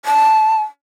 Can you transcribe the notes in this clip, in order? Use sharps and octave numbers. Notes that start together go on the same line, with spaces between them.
A5